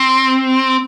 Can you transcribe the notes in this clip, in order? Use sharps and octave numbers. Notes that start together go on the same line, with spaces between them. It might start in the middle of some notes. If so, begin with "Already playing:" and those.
Already playing: C4